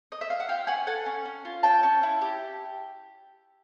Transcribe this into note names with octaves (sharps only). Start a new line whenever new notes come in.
D#5
E5
F5
F#5
F4 F5 G5
C#4 F#5 G#5
A4 F#5 G#5
C#4
C#4
F4
C#4 G5 A5
C#4
E4
G4